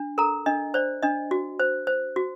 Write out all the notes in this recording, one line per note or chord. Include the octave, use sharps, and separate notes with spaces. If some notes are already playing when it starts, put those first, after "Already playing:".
Already playing: D4
A4 A#4 A#5
D4 D#5
C5 D5
D4 D#5
F#4
C5
C5
F#4